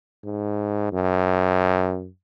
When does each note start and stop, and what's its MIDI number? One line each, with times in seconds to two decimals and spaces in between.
0.25 0.91 44
0.93 2.08 42